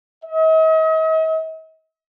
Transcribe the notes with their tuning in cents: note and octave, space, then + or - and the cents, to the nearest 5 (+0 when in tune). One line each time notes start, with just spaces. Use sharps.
D#5 +45